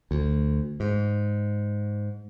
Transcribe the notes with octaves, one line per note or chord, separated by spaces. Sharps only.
D2
G#2